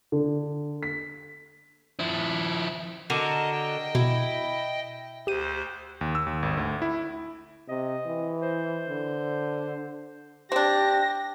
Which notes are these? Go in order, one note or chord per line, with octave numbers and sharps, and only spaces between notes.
D3
B6
F3 E4
D3 F#4 A#4 D#5 A5
D#5 G5
B2 E4
D2 G4 C5 D#7
D#2
E6
D#2
G#1
D2
E4
C3 D#5
E3
C5
D3
C4 D4 G4 A#6